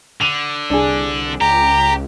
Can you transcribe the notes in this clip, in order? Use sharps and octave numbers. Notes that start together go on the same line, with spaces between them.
D3 D#7 F7
C2 D4 G#4
C#2 G4 A#5